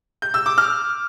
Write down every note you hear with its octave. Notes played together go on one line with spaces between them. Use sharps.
G6
E6
D6
F6